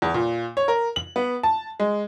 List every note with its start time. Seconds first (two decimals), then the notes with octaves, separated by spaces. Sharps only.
0.02 E2
0.14 A#2
0.57 C#5
0.68 A#4
0.96 F#7
1.16 B3
1.43 A5
1.80 G#3